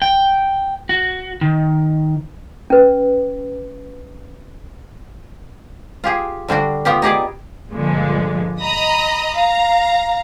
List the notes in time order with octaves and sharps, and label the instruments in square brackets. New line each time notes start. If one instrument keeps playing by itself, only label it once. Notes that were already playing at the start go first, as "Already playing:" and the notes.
[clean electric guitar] G5
F#4
D#3
[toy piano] C#4 B4
[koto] F4 G4 G#4
D3 G3 D4 F#4
B3 F4 G4
D#4 G4 G#4 D5
[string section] G2 A#2 D3 F3 G#3
D#5 A#5 B5 D#6
F5 A#5